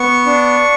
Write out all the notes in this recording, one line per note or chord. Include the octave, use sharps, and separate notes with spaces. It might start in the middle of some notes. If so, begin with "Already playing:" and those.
Already playing: B3 C#6
D4